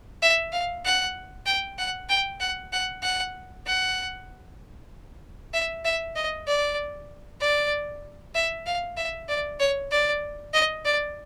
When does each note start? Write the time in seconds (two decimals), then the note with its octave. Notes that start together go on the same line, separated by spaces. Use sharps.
0.22 E5
0.52 F5
0.85 F#5
1.46 G5
1.79 F#5
2.09 G5
2.40 F#5
2.72 F#5
3.03 F#5
3.66 F#5
5.54 E5
5.85 E5
6.16 D#5
6.47 D5
7.41 D5
8.35 E5
8.66 F5
8.97 E5
9.29 D5
9.60 C#5
9.91 D5
10.54 D#5
10.85 D5